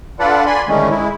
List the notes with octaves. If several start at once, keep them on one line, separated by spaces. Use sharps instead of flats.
D4 F4 A4 B4 D5 F#5
D5 G#5 B5 C6
A2 D3 D#3 G#3 A3 C#4
G#3 E4